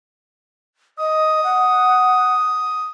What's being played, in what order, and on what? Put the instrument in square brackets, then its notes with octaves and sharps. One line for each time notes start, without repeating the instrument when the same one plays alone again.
[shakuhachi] D#5 [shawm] D#6
[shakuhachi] F#5